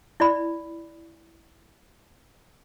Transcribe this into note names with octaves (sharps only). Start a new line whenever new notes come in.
E4 D5 B5